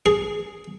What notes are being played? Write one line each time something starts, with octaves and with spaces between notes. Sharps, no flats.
G#4